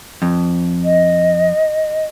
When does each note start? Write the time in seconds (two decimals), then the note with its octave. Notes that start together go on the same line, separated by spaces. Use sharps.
0.22 F2
0.84 D#5